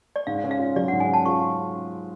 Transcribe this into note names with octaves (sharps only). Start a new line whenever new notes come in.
D5
G#2 F5
C#4
F5
F4
F#3 D5
G#2 F#5
G#5
C#4 A5
F4 C#6